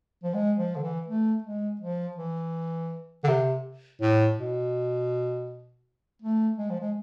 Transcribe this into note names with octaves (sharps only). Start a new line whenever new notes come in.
F3
G#3
F3
D3
E3
A3
G#3
F3
E3
D3
C3
A2
B2
A3
G#3
F3
G#3